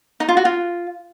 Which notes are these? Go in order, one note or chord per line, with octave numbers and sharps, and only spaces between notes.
D#4
F4
F#4
F4